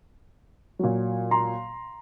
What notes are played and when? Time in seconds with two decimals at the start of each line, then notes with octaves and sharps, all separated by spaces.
0.79 A#2 F#3
1.31 A#5 C6